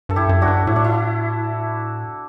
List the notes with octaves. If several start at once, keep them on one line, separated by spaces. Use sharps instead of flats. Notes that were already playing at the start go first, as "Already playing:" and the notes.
G2 A4
E4 G4
F#2
D4 F#4
G2
A2 E4
D4
E4